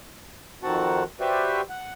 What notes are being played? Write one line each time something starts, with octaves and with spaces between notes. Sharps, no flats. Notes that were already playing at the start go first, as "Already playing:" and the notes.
F2 D#3 C4 F#4 F#5 A5
F#4 G4 B4 C5 D5 E5
F#5